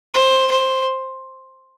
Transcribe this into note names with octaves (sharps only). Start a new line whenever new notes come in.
C5
C5